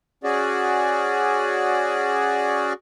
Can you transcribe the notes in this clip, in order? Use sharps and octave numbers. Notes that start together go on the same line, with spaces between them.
C#4 F#4 G#4 D5